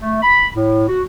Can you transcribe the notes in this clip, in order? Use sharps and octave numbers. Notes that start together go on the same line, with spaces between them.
A3
B5
A2
F#4